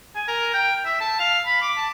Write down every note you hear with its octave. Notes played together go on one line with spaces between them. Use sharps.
G#5
A#4
G5
E5
A5
F5
B5
D6
A5